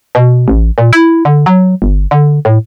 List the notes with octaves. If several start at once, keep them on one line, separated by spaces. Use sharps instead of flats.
B2
A1
A#2
E4
D3
F#3
G1
D3
A2